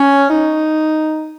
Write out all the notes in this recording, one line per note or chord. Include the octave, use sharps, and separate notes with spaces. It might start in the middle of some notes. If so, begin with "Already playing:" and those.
Already playing: C#4
D#4